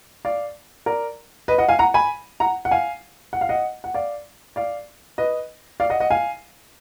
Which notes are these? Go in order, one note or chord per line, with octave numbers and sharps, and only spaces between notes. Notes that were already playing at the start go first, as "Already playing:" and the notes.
D5 F5
A#4 D5
B4 D#5
D#5 F#5
F5 G#5
F#5 A#5
G#5 B5
F#5 A#5
F#5
F5 G#5
F#5
F5
D#5 F#5
F#5
D5 F5
D5 F5
B4 D#5
D5 F5
D#5 F#5
D#5 F#5
F5 G#5